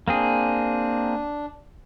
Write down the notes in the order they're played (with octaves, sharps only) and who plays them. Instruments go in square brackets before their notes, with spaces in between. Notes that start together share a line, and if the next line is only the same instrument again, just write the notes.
[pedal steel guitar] A#3 C4 G#4 [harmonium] D4